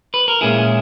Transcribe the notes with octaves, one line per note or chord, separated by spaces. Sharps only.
B4
A#4
A#2 G#3 C#4 E4 G#4